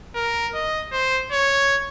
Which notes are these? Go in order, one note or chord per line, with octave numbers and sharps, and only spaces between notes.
A#4
D#5
C5
C#5